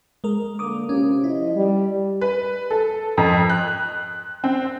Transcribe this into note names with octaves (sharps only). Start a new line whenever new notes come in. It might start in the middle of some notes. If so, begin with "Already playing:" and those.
G#3 A#4
D3 A#3 A#4 D6 D#6
C3 C#4 F4 G4
F3 E4 D#5
G3
B4
A4
F2
F#6
C4